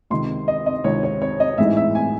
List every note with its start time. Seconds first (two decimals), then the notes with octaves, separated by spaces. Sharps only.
0.10 C#2 C3 D#3 C6
0.48 D#5
0.66 D#5
0.84 C#2 C3 D#3 C#5
1.03 C#5
1.22 C#5
1.40 D#5
1.58 A1 G#2 E3 G#3 D#4 E5
1.77 E5
1.95 G#5